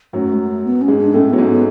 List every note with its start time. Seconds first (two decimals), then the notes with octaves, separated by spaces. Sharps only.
0.13 F#2 F#3 A3
0.33 G#3
0.38 A3
0.64 B3
0.81 C#4
0.88 G#2 G#3
0.97 D4
1.13 A2 A3 C#4
1.29 F#3 B3
1.38 G#2 G#3
1.47 B3